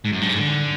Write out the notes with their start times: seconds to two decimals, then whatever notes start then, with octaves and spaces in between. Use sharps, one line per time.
0.05 G#2
0.13 F#2
0.21 G2
0.29 G#2
0.37 D3